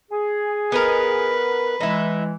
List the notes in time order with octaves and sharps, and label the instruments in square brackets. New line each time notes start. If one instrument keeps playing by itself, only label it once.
[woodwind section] G#4
[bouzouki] B3 D#4 A#4 [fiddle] B4
[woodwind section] E3 G#3 [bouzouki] D#4 E4